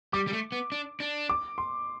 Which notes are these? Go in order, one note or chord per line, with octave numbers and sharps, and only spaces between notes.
G3 D6
G3
A3
B3
D4
D4
D6
C6